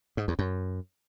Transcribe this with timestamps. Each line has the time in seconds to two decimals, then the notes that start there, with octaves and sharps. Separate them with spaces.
0.17 G#2
0.28 E2
0.39 F#2